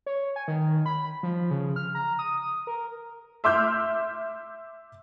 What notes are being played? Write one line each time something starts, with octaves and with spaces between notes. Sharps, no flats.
C#5
G#5
D#3
B5
F3
C#3
F6
A#5
D#6
A#4
E5 C6 D6 E6 F6 G6